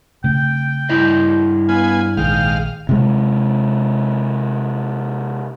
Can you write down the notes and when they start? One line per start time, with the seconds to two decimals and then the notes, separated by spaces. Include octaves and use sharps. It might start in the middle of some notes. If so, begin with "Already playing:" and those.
0.24 C#3 A3 C4 G5
0.89 G2 E4 D#5
1.69 B3 F5 G#5
2.17 A#1 G#2 D#3 F5 G5
2.89 C3 G#3